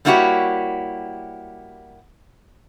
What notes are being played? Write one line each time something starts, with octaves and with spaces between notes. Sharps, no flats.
G3 A#3 E4 F#4 G4 C#5